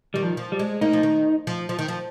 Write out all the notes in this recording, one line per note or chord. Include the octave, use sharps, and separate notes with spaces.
D#3 G3
F3
F3
G3
G#3
A#3 D#4
F3
D#3
F3
F3
D#3
F3